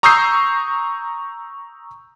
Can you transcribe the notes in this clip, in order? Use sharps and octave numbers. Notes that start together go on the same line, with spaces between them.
A#5 C#6 D#6 E6 G6 C7